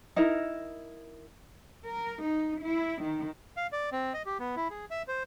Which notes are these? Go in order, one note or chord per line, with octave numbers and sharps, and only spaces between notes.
D#4 E4 A#4
A#4
D#4
E4
D#3
F5
D5
C4
D#5
G4
B3
E4
G#4
E5
C5